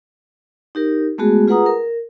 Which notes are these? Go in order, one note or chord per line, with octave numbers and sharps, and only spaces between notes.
D#4 G4 A#4
G#3 A3 B3 F#4 G#4
F4 G#4 B4 F#5 A#5 D#6
A#4